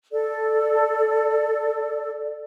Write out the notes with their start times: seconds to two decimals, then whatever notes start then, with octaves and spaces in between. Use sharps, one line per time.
0.12 A4 D5